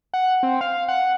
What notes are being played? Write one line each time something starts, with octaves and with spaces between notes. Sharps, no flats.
F#5
C4
F5
F#5